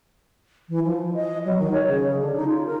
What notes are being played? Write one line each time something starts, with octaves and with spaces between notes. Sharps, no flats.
E3
F3
D#5
F#3
D#3
C#5
C#3
D3
D#4
F4
A#4